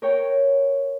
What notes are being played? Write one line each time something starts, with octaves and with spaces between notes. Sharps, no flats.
A#4 C#5 G5